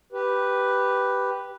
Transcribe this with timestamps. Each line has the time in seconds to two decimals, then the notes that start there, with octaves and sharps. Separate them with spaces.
0.12 G4 B4